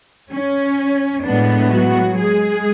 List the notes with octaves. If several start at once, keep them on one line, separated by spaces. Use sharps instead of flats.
C#4
A2 G#3 B3 D4
F#3 F#4
G#3 G#4